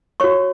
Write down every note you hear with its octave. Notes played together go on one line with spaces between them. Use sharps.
F#4 C#5 C#6